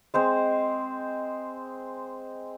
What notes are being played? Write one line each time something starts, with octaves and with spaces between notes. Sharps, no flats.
G#3 C4 C5